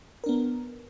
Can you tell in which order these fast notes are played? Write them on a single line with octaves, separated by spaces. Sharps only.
A#4 D4 B3